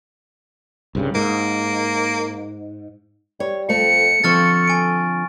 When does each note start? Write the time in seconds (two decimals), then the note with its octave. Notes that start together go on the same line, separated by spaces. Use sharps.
0.95 C2 G2 C#3
1.15 G#2 A#3
3.40 G3 C#5
3.69 F2 A3 A#4 C#7
4.24 D3 F3 C4 A4 C#6 F6 A6
4.68 G#5 D7